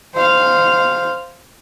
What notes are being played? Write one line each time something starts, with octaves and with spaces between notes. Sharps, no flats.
C5 F5